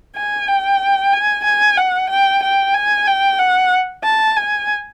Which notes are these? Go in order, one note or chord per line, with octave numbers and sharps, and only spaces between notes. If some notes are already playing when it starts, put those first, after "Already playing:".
G#5
G5
G#5
G#5
F#5
G5
G5
G#5
G5
F#5
A5
G#5